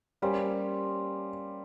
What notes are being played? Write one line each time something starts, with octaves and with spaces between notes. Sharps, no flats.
G3 A#3 C#4 G4 C5